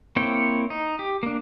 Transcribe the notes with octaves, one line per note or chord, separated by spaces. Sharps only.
A#3 C4 E4 C#5 G5
D#4
G4
A#3 D4